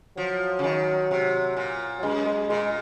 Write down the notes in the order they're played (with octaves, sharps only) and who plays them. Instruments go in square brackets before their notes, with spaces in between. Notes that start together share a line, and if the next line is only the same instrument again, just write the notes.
[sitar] F3 [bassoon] F#3
[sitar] C#3
D#3
C3
A#2
[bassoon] F#3
[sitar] F#2 [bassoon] G#3
[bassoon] G#3
[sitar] A#2 [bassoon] G#3